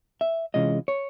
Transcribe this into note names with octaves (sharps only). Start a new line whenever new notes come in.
E5
C3 E3 G#3 C#4 F4 D#5
C#5